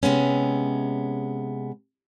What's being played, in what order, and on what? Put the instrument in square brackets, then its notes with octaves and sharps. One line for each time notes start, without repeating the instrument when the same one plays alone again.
[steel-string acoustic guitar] C3 G#3 B3 C#4